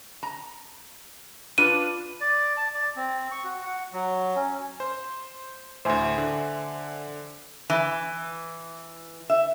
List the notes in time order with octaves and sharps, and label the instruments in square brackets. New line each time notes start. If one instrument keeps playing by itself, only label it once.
[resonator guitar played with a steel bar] A#5
[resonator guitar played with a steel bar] D4 F4 B4 [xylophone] D#7
[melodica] D5
A5
D5
C4
C#6
F#4
F#5
F#3
C#4
[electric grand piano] C5
[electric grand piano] D2 A2 [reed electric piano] C5 E5 G#5
[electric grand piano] D3
[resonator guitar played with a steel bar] E3
E5